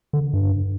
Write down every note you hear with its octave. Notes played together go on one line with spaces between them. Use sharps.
D3
G2